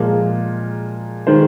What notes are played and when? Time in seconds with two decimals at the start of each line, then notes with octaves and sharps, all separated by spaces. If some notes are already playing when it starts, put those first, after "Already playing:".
Already playing: A#2 F3 G#3 A#4
1.27 D#3 G#3 C5